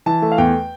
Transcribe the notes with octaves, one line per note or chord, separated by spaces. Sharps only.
E3 A5
A3
F5
E2 G5